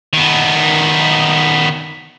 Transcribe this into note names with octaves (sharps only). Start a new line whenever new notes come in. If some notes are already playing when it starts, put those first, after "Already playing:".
D#3 B3